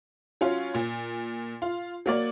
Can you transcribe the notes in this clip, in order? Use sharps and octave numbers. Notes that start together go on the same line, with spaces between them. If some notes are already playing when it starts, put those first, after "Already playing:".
F#3 C#4 F4
A#2
F4
F#3 A#3 D5